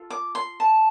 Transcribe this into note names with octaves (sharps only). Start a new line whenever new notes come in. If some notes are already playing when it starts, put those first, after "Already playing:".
Already playing: F4 A4
D6
C6
A5